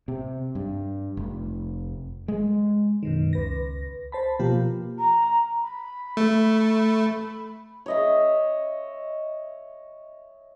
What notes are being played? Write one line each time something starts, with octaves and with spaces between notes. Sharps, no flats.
C3
G2
F1
G#3
F#2 B2 D#3
C#2 B4 A#6
C5 A5 B5
B2 F3 A#3 F4 G4
A#5
B5
A3
B5
C#5 D#5 E5